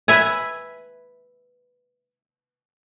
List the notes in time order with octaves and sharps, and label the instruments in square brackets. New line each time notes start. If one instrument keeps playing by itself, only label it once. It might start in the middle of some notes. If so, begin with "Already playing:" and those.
[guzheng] B4 E5 G#5